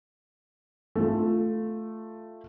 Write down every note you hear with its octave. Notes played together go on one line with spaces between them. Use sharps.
A3 F4